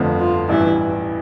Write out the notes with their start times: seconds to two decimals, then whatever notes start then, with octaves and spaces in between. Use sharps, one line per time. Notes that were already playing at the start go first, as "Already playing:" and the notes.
Already playing: G1 F2 D3 F3 A3
0.20 F4
0.48 A1 G2 E3 E4